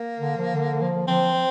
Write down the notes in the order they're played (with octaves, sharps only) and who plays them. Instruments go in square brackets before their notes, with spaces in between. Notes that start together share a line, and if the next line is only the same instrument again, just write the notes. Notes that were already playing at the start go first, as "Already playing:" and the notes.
Already playing: [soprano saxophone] A#3
[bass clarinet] D3
F3
D3
F3
[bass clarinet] F3 [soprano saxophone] C4
[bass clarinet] F3